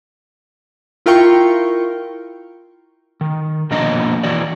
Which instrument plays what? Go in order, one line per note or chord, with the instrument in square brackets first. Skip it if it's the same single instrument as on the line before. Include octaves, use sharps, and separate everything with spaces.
[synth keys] E4 F4 A#4 G5 C#6
[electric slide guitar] D#3
B2 F3 A#3 D4 D#5 A#5
E3 E4 F#4 D5